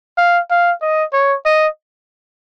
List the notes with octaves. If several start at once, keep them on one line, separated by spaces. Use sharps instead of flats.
F5
F5
D#5
C#5
D#5